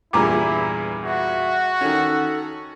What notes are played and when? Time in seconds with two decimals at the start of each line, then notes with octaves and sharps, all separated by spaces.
0.13 E2 G2 A#2 E4 G#4 A#5 D6
1.05 F#4 E5
1.81 D#3 C#4 A4